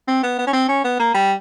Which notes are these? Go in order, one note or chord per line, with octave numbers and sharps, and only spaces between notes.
C4
B3
B3
C#4
C4
C#4
B3
A#3
G3